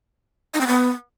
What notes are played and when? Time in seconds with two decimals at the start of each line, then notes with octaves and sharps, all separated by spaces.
0.54 D#4
0.61 C4
0.67 B3